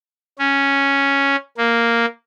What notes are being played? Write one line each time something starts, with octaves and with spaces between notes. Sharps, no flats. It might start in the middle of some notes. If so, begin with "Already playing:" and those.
C#4
A#3